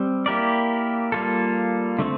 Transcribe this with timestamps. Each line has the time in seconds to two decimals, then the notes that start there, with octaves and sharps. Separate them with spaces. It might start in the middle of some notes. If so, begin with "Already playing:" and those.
Already playing: G3 C4
0.26 A#3 E4 G4 A#4 D5
1.12 G3 A#3 F4 A4
1.99 D3 A3 C4